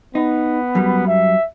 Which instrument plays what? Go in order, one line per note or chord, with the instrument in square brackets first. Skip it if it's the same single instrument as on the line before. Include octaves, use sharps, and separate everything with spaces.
[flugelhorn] B3 [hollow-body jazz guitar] D#4
[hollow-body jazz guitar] F#2 G3
[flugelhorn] E5